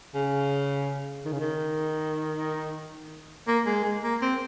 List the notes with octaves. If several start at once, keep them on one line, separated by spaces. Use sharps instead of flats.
C#3
D#3
C#3
D#3
A#3
G#3
G#3
A#3
C4